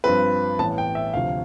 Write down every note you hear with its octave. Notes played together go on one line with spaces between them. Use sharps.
G2 F3 C4 B4
A1 A2 E3 B3 A5
G5
E5
D2 C3 F3 F5